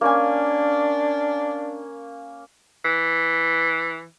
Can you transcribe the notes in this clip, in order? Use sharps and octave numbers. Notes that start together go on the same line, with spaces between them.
A#3 C#4 D4 G#5
E3